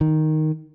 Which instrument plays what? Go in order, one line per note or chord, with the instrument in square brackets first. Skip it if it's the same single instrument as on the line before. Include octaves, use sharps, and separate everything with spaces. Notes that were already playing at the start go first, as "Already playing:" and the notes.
[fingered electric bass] D#3